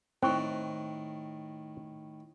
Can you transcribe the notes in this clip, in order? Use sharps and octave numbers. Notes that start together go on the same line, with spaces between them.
A2 D#3 C4 C5 C#6